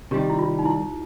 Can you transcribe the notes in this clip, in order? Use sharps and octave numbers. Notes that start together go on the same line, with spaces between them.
C3 D#3 G3 G4
E4
F4
D#4
E4